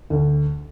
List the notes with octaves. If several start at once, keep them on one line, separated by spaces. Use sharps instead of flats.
D2